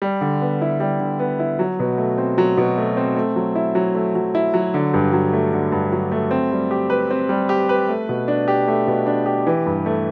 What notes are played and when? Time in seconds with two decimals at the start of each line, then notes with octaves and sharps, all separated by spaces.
0.02 G3
0.21 D3
0.41 B3
0.61 E4
0.80 G3
1.00 D3
1.19 B3
1.40 E4
1.59 F#3
1.79 B2
1.98 A3
2.18 C4
2.38 F#3
2.58 B2
2.78 A3
2.97 C4
3.16 A3
3.36 F#3
3.55 E4
3.75 F#3
3.95 A3
4.15 F#3
4.35 E4
4.54 F#3
4.74 D3
4.94 G2
5.13 F#3
5.33 A3
5.53 D3
5.72 G2
5.92 F#3
6.12 A3
6.31 C4
6.51 G3
6.71 G4
6.90 B4
7.11 C4
7.29 G3
7.49 G4
7.69 B4
7.89 A3
8.09 B2
8.28 D4
8.48 G4
8.68 A3
8.87 B2
9.06 D4
9.26 G4
9.47 E3
9.66 G2
9.86 A3